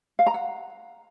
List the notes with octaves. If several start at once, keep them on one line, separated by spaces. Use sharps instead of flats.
F5
A#5
F#5